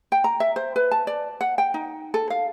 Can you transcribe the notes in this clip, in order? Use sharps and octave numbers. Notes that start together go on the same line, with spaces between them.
G5
A#5
E5
C5
B4
A5
D5
F#5
G5
D#4
A4
F5